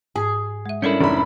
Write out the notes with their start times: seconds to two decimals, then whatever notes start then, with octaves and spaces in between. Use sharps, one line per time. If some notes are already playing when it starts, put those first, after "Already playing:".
0.16 G#2 G#4
0.66 G#3 E5
0.82 G3 C#4 D4 E4 A4 A#4
1.01 F1 D#4 B5